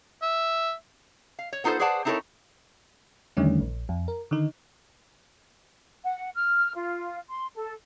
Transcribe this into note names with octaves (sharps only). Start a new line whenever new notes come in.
E5
F5
C#5
B3 D#4 F4 G4 A4 C5
G#4 B4 C5 D5 F#5 A5
C4 D#4 E4 A4 A#4 C#5
E2 D3 D#3 G3 A3 C#4
A#1
F2
A#4
D3 D#3 D#4
F#5
F6
F4
C6
A4